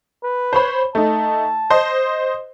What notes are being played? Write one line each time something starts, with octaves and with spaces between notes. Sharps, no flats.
B4
C5 C#5 B5
A3 D#4 A5
C5 D#5 C6